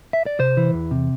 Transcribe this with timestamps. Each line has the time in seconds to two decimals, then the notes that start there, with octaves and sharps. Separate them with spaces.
0.13 E5
0.26 D5
0.39 C3 C5
0.57 E3
0.74 E2
0.91 C3